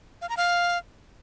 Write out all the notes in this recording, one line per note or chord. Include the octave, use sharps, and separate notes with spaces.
F5
A#5
F5